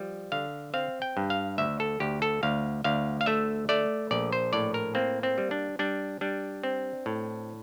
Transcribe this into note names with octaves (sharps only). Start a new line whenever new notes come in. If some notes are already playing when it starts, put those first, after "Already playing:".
Already playing: F3 G3
D3 F5
C4 F5
G5
G2
F5
D2 E5
A4
D2 G4
A4
D2 F5
D2 F5
F5
A3 E5
A3 D5
A#1 D5
C5
A2 D5
A#4
A#3 C4
C4
G3
D4
G3 D4
G3 D4
C4
A2